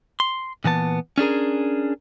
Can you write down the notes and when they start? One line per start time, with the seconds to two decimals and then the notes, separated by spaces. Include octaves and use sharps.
0.20 C6
0.64 A#2 E3 B3 A5
1.18 C#4 D4 G#4 A#4